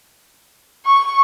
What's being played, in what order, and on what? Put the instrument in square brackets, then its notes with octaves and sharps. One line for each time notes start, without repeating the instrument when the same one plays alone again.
[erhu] C#6